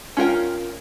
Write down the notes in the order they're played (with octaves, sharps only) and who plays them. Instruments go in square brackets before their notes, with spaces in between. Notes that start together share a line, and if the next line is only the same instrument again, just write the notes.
[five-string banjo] C#4 F4 A#4 G5